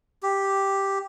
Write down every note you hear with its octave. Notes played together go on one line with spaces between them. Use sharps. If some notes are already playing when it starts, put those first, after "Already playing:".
G4